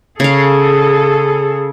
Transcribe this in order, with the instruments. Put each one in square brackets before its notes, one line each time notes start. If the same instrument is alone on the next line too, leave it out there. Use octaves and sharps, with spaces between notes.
[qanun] C#3 F5 [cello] G#4 A4